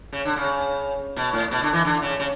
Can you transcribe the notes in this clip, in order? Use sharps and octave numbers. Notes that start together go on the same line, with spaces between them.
C#3
D3
C#3
B2
A2
B2
D3
E3
D3
C#3
C#3